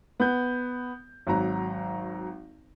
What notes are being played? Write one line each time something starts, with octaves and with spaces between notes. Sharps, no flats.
B3 G6
G#1 F#3 A#5